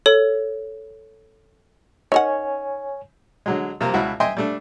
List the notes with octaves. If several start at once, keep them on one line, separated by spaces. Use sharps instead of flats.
A4 C#5
D#4 A#4 C#5 F#5 G#5
D3 F#3 G#3
C3 F3 A#3
C#2 B2 E4 F#4
D#5 E5 G5 G#5 C6
G3 A3 D4